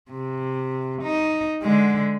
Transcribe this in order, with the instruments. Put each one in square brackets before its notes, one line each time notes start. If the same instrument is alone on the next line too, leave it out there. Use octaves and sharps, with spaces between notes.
[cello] C3
D#4
D3 G#3